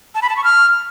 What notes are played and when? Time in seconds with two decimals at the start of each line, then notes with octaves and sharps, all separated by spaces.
0.15 A5
0.22 B5
0.29 A5
0.37 C#6
0.44 F6